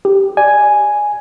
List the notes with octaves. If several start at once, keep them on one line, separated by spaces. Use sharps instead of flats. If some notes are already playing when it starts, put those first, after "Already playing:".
G4
D5 G#5